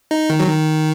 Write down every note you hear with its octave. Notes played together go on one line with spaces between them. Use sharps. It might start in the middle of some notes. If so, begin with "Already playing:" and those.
D#4
D#3
F#3
D#3